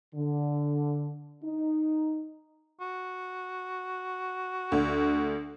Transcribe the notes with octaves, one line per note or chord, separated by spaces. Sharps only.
D3
D#4
F#4
D2